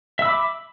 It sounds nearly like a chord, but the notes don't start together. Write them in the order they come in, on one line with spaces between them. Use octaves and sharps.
E5 E6 B5 D6